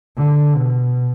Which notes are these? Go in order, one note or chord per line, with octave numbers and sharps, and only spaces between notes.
D3
B2